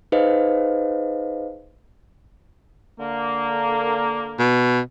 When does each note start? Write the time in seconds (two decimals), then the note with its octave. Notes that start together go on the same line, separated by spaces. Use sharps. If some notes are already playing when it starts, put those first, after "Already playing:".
0.12 D#4 G#4 B4 C5 D#5 F5
2.98 D3 A#3
4.40 B2